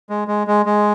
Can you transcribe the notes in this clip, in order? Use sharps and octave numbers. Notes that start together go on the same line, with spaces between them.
G#3
G#3
G#3
G#3